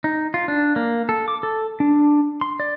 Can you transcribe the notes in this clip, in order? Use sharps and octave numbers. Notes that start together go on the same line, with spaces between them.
D#4
F4
D4
A#3
A4
D6
A4
D4
C6
D5